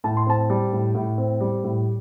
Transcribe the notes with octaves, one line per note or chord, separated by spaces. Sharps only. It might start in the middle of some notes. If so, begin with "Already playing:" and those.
A2 A5
C6
C4 A5
G3
A2
A2
C4
G3
A2